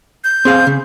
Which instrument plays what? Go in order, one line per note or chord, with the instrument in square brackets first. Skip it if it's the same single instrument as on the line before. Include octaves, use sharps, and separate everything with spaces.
[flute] G6
[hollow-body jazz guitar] C4 G#4 F5
C#3